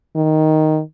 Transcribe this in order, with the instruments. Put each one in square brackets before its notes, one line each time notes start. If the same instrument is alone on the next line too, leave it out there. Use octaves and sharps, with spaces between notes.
[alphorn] D#3